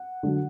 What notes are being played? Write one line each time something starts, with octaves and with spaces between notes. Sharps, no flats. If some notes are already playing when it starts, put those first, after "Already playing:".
Already playing: F#5
D3 F#3